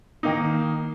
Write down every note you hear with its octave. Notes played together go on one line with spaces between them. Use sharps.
D#3 A#3 D#4